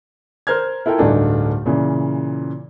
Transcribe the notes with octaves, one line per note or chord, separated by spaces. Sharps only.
A#4 C5 A#5 F6 G#6
E4 F4 A4 A#4 G5
D1 G2 A3 D4 D#4 G#5
A#2 C#3 E3